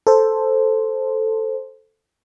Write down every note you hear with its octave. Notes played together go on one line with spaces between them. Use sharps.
A4 C5